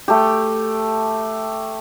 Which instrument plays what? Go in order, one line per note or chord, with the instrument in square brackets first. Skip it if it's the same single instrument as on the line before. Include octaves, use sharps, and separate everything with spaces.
[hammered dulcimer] A3 G4